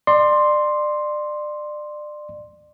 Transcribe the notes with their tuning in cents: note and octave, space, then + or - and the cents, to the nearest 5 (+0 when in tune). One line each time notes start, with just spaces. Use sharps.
D5 +30 C6 +5